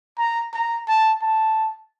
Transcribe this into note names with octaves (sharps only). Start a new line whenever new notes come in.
A#5
A#5
A5
A5